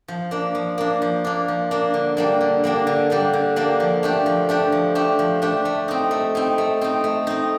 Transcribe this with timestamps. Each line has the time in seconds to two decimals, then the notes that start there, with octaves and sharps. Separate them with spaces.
0.08 F3
0.31 A#3 D4
0.55 F3
0.78 A#3 D4
1.02 F3
1.24 A#3 D4
1.48 F3
1.71 A#3 D4
1.94 D3
2.17 G3 A#3 D4
2.41 D3
2.64 G3 A#3 D4
2.87 D3
3.10 G3 A#3 D4
3.33 D3
3.56 G3 A#3 D4
3.80 F3
4.03 A3 D4 G4
4.26 F3
4.49 A3 D4 G4
4.72 F3
4.95 A3 D4 G4
5.19 F3
5.42 A3 D4 G4
5.65 A3
5.88 C4 D#4
6.11 A3
6.35 C4 D#4
6.58 A3
6.81 C4 D#4
7.04 A3
7.27 C4 D#4